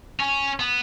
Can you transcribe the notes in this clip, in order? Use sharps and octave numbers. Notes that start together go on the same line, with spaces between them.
C#4
B3